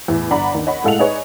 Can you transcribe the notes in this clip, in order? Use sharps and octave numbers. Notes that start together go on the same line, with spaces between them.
E2 A2
G1 D5 F#5 A#5 B5
D#2
C#5 D#5 F#5 B5
A2 G#3 A4 F5 F#5 F7
D#4 G#4 B4 C#5 D5